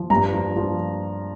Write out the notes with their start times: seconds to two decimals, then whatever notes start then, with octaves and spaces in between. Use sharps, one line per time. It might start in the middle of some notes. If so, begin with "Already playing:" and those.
Already playing: F3
0.10 G2 A#5
0.33 F3
0.56 F3